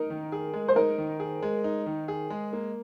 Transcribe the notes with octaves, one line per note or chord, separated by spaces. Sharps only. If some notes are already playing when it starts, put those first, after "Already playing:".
Already playing: D#4 A#4
D#3
G#4
G#3
C5
D#4 A#4
D#3
G#4
G#3
D#4
D#3
G#4
G#3
A#3